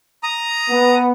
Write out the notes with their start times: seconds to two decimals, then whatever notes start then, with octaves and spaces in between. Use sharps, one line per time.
0.23 A#5 D#6
0.70 B3